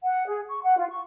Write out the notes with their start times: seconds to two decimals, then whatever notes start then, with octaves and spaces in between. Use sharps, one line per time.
0.04 F#5
0.27 G#4
0.48 C#6
0.62 F#5
0.77 F4
0.91 C#6